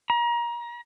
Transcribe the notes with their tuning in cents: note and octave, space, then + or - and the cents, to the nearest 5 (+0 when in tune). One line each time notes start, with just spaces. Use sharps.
A#5 +30